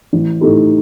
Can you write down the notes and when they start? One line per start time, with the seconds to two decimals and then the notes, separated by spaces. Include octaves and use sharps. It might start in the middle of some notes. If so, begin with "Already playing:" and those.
0.13 A1
0.41 A2 A3 D#4 G4